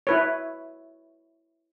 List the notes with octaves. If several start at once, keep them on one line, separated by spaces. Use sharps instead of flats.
E4 B4 C#5